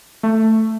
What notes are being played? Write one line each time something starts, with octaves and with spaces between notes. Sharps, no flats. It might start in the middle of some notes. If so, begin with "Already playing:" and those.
A3